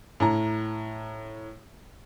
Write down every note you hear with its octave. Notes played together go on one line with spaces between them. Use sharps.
A2 A#5